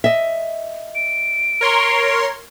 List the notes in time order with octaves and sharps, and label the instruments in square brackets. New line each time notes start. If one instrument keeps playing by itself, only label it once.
[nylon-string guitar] D#5 E5
[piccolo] D7
[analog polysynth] A#4 C#5 C6